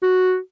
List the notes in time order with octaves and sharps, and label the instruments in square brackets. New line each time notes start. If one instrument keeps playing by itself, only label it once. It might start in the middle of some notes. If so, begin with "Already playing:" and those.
[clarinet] F#4